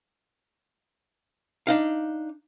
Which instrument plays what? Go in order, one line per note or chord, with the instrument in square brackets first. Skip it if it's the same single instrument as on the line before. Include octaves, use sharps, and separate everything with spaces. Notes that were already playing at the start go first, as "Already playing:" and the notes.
[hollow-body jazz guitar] D4 D#4 F5